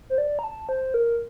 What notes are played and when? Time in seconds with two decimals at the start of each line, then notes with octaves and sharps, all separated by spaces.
0.10 C5
0.18 D5
0.39 A#5
0.44 A5
0.69 C5
0.94 A#4